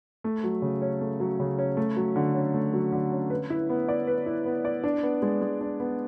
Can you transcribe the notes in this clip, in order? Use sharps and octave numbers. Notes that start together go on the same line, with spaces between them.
A3
F#3
C#3
C#4
A3
F#3
C#3
C#4
A3
F#3
D3
C#4
A3
F#3
D3
C#4
B4
E4
B3
D5
B4
E4
B3
D5
D4
B3
G#3
G#3
D4
B3